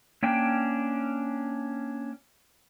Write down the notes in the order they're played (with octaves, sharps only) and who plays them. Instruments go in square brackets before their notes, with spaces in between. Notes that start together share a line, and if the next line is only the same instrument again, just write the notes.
[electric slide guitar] A#3 C#4 D4 G5